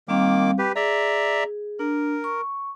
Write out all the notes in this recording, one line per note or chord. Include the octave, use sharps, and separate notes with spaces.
D#3 G3 A#3 C4 F5 D6
G4 B4
G#4 D5 E5 A#5
D4 A#4
C#6